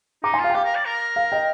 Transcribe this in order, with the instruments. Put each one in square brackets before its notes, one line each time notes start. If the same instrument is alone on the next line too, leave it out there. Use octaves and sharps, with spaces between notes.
[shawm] D#4 [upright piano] A#5 D6
[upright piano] G#5 C6
[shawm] F4 [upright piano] F5
[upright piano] G5
[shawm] G4 [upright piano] F5
[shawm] A#4
D5
A#4
[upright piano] F5
D#5 G5